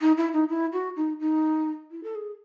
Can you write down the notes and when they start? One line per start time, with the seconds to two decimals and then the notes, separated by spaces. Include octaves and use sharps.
0.01 D#4
0.17 E4
0.33 D#4
0.49 E4
0.73 F#4
0.96 D#4
1.20 D#4
1.91 E4
2.03 A4
2.15 G#4